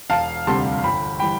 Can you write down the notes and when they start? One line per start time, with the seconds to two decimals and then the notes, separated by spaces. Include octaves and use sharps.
0.10 E1 F5 A5
0.47 D2 C3 G3 A5 C6
0.84 G1 G5 B5
1.19 E3 G3 G5 B5